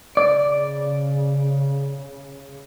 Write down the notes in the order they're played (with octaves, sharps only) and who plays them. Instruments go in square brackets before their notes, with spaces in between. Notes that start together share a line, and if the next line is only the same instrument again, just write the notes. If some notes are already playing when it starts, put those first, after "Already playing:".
[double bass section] C#3 [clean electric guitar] D5